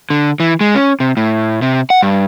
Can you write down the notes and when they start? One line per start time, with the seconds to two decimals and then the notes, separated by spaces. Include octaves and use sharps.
0.10 D3
0.40 E3
0.61 G#3
0.75 C#4
1.00 C3
1.17 A2
1.62 C3
1.90 F#5
2.02 G2